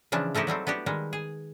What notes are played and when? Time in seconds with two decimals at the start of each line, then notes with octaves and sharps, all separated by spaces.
0.12 C#3 E3 F3 D4
0.35 F3 A3 D#4 E4 G4
0.47 F#3 G3 A3 C4
0.67 B3 D4 F#4 G4
0.86 D#3 G3 G#3
1.13 G#4